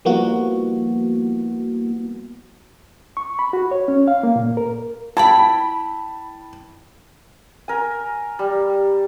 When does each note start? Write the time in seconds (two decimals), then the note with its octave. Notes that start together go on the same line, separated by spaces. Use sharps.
0.05 F3 G3 A#3 B3 E4 F#4
3.17 C#6
3.39 B5
3.53 F#4
3.71 C#5
3.88 C#4
4.08 F5
4.23 A#3
4.36 A#2
4.57 A#4
5.17 E4 G5 A5 B5
7.68 A#4 G#5
8.39 G3